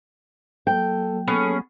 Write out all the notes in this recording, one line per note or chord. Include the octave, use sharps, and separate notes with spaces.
F#3 A#3 A4 G5
B3 C#4 G#4 A4